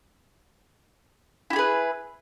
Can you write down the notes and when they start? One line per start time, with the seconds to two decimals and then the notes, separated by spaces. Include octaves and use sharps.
1.50 E4
1.53 G4
1.56 G#4
1.59 B4